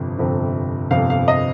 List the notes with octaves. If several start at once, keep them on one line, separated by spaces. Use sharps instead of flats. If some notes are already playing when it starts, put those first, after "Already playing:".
Already playing: G1 F2 C3 F3 C4
G1 F2 C3 F3 C4
G1 F2 C3 F3 C4 F5
F5
D#5